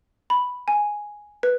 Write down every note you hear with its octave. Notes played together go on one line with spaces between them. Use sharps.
B5
G#5
B4